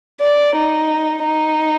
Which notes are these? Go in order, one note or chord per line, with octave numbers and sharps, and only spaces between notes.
D5
D#4
D#4